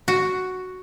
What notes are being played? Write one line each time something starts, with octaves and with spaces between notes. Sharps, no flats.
F#4